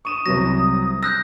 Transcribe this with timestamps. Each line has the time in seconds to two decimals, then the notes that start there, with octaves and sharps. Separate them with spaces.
0.05 C#6 D#6 D#7 E7
0.26 C2 C3 F#3 A#6
1.03 E6 F#6 G6 A#6